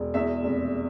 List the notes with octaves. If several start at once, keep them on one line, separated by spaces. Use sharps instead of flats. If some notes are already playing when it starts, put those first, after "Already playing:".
Already playing: E1
E2 E5
F1